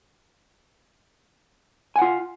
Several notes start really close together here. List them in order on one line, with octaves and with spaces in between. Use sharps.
G#5 F#5 F4